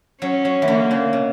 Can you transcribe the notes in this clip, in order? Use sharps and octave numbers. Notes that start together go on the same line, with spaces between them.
F#3 C#4
F#3
E3
D3 A#3
C#3
B2